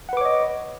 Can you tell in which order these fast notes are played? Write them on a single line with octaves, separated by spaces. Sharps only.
F#5 B4 D6 C#5 D#5